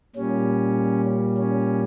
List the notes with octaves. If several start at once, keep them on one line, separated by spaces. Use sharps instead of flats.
A#2 G3 C#4
C#4